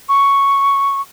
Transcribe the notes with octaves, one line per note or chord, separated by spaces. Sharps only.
C#6